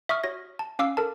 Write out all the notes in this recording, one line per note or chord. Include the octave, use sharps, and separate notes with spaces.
E5 C#6 D#6 F6
F#4 C#5 A#6
A5
C#4 F5 D6 E6 C7
A4 A#4 A5